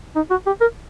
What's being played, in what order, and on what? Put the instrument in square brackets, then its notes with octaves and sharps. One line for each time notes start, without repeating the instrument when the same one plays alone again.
[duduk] D#4
F#4
G4
A#4